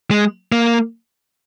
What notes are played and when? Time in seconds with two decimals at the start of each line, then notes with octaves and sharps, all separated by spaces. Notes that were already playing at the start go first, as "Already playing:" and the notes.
0.11 G#3
0.52 A#3